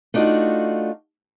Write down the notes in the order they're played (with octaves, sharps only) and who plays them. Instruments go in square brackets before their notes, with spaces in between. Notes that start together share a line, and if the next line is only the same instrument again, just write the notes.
[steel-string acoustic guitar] A3 D4 D#4 F4 F#4